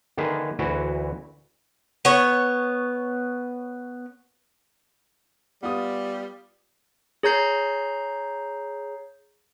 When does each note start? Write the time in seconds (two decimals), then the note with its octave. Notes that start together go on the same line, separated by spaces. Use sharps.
0.17 D3 D#3 A#3 G#4 B4 E5
0.59 D2 E3 E4 F#4
2.05 B3 C#5
5.63 G3 B3 F4 D#6
7.23 G#4 C#5 A#5 G6 C7